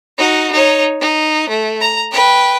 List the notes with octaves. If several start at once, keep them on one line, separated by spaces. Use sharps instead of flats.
D#4 F#4
D#4 C#5
D#4
A3
A#5
B4 G5